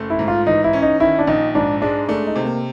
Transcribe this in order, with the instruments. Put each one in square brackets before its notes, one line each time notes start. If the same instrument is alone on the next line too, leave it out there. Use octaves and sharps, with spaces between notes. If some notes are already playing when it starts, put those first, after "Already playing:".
Already playing: [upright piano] F#1 A3
[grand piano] E4
[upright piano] G#2
[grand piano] F4
[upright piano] E3 [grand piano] D#4
[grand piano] E4
[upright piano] C#4
[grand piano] D#4
[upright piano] D#3 [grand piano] E4
[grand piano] D4
[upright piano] A#1 [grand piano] D#4
[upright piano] G#2 [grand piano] D4
[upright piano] G#3 [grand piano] D4
[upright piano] A3 [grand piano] D4
[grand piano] D#4
[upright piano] C3
[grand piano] A#3